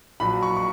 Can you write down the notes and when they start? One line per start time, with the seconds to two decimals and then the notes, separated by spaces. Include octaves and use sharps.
0.20 A#1 A#2 F#3 B5
0.43 C#6
0.57 C#6